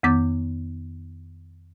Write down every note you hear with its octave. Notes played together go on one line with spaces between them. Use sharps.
F2 D#3 B3 D6 G6 A6